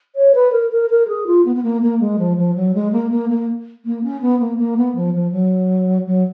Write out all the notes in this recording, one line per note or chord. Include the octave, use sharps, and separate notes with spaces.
C#5
B4
A#4
A#4
A#4
G#4
F4
B3
B3
A#3
A#3
G#3
F3
F3
F#3
G#3
A#3
A#3
A#3
A#3
C#4
B3
A#3
A#3
B3
F3
F3
F#3
F#3